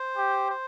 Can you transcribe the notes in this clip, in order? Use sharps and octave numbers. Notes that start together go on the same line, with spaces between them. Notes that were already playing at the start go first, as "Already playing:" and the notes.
Already playing: C5
G4
C5